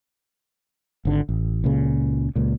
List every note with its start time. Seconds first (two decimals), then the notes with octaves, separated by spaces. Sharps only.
1.05 G#1 D3
1.29 A1
1.64 C#2 A#2 C#3
2.35 C#2 A#2